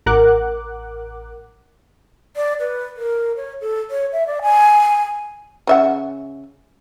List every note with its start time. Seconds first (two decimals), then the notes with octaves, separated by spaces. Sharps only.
0.06 A1 A#4 F#5 D6 F#6
2.36 D5
2.59 B4
2.97 A#4
3.36 C#5
3.61 A4
3.91 C#5
4.12 E5
4.27 D5
4.42 G#5
5.67 C#3 E5 F#5